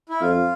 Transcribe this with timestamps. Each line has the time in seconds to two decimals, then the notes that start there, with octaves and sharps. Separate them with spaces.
0.09 E4
0.21 F2 F4